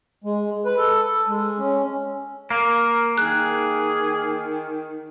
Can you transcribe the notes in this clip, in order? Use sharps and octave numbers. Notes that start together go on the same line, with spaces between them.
G#3
B4
A4
G#3
C#4
A#3 A#4
D#3 G#4 F#6